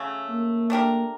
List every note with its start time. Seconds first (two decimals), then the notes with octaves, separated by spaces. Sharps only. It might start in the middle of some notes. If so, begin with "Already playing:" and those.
Already playing: C#3 F#3 A3
0.29 A#3
0.70 A3 D4 G4 A#4